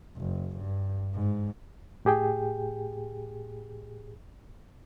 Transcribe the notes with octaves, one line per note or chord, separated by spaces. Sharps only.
F#1
G2
G#2
A2 G4 G#4 G5